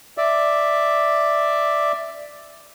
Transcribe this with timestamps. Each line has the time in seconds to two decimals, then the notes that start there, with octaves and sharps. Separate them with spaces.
0.18 D5 E5